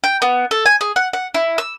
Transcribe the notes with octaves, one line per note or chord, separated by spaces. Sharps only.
G5
B3
A4
G#5
G#4
F#5
F#5
E4
E6